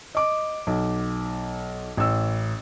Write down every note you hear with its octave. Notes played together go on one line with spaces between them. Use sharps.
D#5 D6
B1
A1 E6